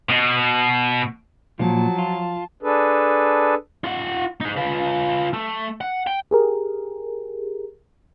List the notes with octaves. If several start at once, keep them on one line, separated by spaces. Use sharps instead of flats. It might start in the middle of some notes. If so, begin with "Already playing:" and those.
B2
A#2 F3 F#3 A5
F4
D4 G#4 A4 B4
F4 F#5
D#4 G#4
F4 B4
A3
F#5
G5
G4 G#4 A#4